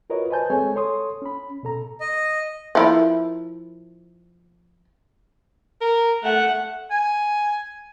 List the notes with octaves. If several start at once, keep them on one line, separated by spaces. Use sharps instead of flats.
F4 F#4 A#4 B4 C#5 D#5
B4 C5 D#5 G#5 A5 G6
G#3 C4 G#4 A4 C#5 G#5
A4 C#5 C6 D#6
C#4 B5
B2 A4 A#5
D#5
F3 E4 A#4
A#4
A3 F#5
G#5